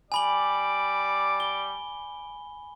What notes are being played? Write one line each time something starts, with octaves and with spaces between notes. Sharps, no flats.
G3 D5 G#5 B5 D6 F#7
G7